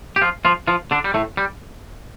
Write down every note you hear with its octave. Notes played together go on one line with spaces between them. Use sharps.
G4
F3 F4
F3 F4
F3 F4
D3 D4
G3
A2 A3
G3